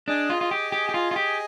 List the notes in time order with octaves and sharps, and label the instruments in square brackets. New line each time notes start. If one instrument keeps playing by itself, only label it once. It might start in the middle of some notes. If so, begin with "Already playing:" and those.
[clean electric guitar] D4 [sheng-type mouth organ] G#4 D#5 G#5
[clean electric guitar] F4
F4
G4
G4
G4
F4
F4
G4